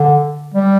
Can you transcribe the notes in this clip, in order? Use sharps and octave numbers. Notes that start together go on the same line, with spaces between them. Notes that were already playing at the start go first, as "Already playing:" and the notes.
Already playing: D3
G3